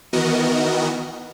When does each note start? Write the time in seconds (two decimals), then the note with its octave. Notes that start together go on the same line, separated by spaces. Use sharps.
0.13 D#3 E3 B3 F#4 A#4 D#5